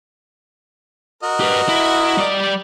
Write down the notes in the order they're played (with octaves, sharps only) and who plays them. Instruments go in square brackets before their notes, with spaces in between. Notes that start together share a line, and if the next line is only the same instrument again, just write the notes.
[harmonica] F#4 A#4 D#5
[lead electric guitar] G4 B4
E4
G3 D5